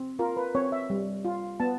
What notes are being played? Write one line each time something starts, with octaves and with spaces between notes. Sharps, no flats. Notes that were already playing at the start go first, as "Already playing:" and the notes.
Already playing: C4
F4 A#4
B4
C4 C#5
E5
G3
F4
B3 A5